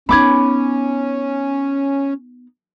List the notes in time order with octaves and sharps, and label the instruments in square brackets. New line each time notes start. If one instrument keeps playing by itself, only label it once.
[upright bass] B3 D#4 [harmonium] C#4 [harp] B5 D6 G#6